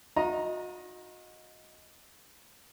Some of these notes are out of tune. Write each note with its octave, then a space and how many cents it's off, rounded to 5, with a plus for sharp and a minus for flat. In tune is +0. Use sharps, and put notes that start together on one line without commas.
F#4 -40 D#5 +5 A#5 +0